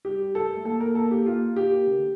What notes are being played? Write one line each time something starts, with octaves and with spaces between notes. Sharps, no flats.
G3 G4
A4
A3
A#3 A4
A#4
A4
G4
A#3 F4
G4
C#3
D3